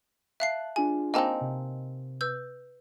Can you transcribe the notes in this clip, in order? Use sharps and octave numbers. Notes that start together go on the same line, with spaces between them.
E5 F5 A5 F#6 C7
D4 F4 G#4 G#5
A#3 C4 D#4 D#5 G#5 A5
C3
B4 E6 G6